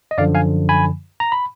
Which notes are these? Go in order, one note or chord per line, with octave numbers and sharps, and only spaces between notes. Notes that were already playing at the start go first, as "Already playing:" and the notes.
D#5
F#2 D3 F3 D5 F5
F5 G#5
G#5 B5
A#5
B5